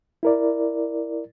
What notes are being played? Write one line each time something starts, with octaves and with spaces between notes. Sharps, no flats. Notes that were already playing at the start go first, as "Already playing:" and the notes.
E4 A#4 D5